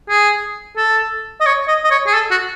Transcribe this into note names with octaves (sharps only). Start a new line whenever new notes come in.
G#4
A4
D#5
C#5
D#5
D#5
C#5
G#4
A4
F#4